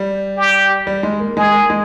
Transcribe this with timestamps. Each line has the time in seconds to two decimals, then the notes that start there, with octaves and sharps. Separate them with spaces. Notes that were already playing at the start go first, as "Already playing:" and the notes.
Already playing: G3
0.37 G4
0.87 G3
1.03 G#3
1.20 A#3
1.37 G#3 G#4
1.53 A#3
1.70 G#3